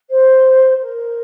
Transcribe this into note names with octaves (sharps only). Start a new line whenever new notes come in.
C5
A#4